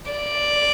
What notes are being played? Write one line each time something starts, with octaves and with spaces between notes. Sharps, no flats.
D5